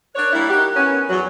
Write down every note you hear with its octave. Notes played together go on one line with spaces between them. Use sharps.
D4 A#4 C#5 F#6
G3 A#3 E4
D#4 F#4 G4
B3 C#4
E2 F#3